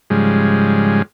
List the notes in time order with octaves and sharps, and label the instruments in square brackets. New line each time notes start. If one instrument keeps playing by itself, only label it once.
[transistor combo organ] G#2 C#3 F3 G3 G#3